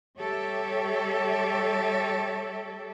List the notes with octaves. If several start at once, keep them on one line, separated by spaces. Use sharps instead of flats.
G3 G4 A4 C#5 E5